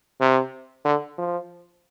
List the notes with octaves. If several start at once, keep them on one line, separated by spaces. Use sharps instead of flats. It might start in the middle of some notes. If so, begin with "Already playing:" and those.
C3
D3
F3